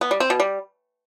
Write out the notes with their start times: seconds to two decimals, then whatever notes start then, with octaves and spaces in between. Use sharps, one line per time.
0.01 B3
0.11 G3
0.20 C4
0.30 B2
0.40 G3